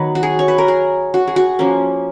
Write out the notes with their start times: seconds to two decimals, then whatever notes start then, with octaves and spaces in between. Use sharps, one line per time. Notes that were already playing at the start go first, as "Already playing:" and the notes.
Already playing: D#3 F#3 B3 B4 C#5
0.15 F#4
0.23 G#4
0.39 C#5
0.48 B4
0.58 A#4
0.68 G#4
1.14 F#4
1.27 G#4
1.36 F#4
1.59 F3 A#3 C#4